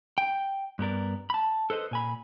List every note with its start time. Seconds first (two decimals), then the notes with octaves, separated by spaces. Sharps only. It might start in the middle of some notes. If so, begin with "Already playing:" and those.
0.18 G5
0.79 G2 B3 A#4 D5
1.30 A5 B5
1.70 A4 B4 C5 D#5
1.91 A#2 G#5 B5